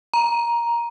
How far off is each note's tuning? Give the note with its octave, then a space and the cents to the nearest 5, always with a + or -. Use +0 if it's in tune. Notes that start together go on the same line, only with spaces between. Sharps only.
A#5 +10